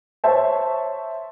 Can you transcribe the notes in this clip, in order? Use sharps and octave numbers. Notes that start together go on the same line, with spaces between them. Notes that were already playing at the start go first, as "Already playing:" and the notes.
C5 C#5 E5 A5